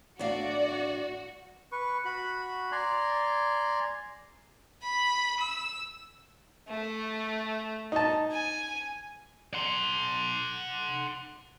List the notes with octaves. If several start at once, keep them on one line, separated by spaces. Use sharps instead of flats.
A2 D4 F#4 D5 F5
B4 C#6
F#4 B5
D5 G#5 A#5 C6
B5
E6
A3
D#4 A5
G#5
F#5 C6